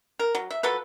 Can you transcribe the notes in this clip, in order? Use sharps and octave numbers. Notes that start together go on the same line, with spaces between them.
A#4
F#3
E5
F3 F#3 A4 B4